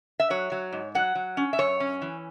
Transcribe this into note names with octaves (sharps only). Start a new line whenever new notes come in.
E5
F#3 C#5
F#3
G#2
F#3 F#5
F#3
C#4
E5
F#2 C#5
C#4
E3